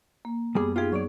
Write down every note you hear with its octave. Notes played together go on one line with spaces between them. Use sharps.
A#3
F#2 G3 B3 G#4 D6
D#4 F4 G4 G#4 F5
F#3 C#5 D5